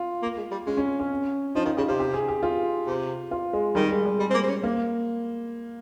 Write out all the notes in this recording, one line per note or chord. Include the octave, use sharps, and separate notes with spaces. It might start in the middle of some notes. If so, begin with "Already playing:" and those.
Already playing: F4
A#3
G#3
G3
G#3 C#4
C#4
C#4
F3 D#4
D#3 F4
C#3 G4
C3 F4
G4
G#4
G4
F4
C3
F4
G#3
D#3 G3
G#3
G3
G3 G#3
C4
A#3
C4
C#4
A#3